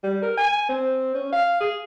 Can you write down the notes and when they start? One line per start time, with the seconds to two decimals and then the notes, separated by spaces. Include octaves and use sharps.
0.04 G3
0.22 A#4
0.37 G#5
0.69 C4
1.15 C#4
1.33 F5
1.61 G#4